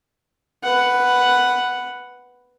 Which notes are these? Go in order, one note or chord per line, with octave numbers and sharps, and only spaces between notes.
B4 F#5